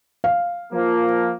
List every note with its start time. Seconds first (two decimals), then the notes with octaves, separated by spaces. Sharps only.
0.24 F5
0.73 F3 A#3